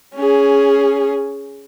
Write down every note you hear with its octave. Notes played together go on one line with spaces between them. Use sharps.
C#4 G#4